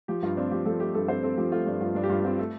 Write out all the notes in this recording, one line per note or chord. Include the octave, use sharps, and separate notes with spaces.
F3 G4
G2 F4
C4 D4
F3 G4
F3 A4
A3 G4
G2 A4
C4 C5
C4 A4
F3 G4
A3 F4
G2 D4
G2 F4
G2 D4
G4
G2 F4
C4 F4
A3 A4